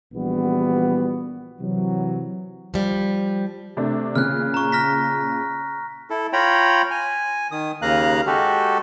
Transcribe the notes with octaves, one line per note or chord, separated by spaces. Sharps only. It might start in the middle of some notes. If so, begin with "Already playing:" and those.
A#1 E3 G3 B3 F#4
C3 E3 F#3
F3 G3
C3 A3 D4
A#2 C#3 F6 F#6
A#5 C#6
F6 A#6 B6
E4 A4
F4 C#5 G5 A#5 B5
G#5
D#3 D#6
D#2 C#3 A#3 F5 A#5 F#6
G#3 F#4 G4 A4